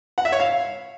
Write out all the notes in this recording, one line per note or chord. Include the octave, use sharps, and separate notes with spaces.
F#5
E5
C#5
F5